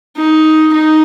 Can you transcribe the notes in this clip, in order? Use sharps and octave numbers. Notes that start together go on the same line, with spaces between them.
D#4
D#4